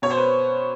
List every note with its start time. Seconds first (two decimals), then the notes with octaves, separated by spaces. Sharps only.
0.02 B2 C#5
0.10 C5
0.17 B4